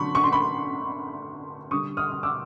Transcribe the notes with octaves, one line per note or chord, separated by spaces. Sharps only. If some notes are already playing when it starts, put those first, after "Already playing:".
Already playing: D3 F#3 B5 C#6
C#6
C6
B5 C#6
D3 G3 C#6 D#6
D#6 F6
D#6
D6 E6